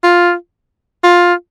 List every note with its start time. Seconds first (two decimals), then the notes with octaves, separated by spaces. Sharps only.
0.03 F4
1.04 F4